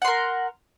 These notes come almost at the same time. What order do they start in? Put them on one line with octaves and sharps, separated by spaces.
F#5 C6 A#4